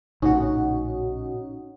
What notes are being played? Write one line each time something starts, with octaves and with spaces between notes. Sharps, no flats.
A#1 A2 C#3 C#4 D#4 F#4